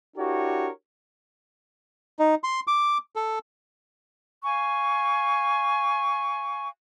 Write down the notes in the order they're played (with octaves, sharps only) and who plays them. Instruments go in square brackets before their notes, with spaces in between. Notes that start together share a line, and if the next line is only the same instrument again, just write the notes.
[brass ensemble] D4 E4 F#4 G4 A#4 C#5
[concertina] D#4
C6
D6
A4
[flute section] F5 G#5 C#6